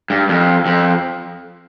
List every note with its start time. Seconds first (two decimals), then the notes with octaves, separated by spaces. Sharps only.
0.10 G2
0.29 F2
0.66 F2